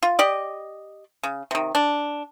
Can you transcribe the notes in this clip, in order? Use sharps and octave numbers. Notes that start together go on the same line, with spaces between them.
F4
G4 D5 D#5
C#3
C3 D#3
D4